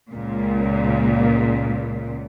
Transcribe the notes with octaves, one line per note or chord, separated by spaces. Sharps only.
C#2 A#2